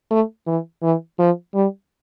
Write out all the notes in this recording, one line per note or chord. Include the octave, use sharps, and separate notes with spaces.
A3
E3
E3
F3
G3